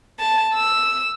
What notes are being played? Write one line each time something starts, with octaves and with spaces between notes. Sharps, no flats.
A5
E6